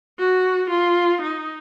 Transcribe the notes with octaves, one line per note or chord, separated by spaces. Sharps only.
F#4
F4
D#4